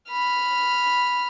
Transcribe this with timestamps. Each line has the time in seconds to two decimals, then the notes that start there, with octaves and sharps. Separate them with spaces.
0.11 B5 F6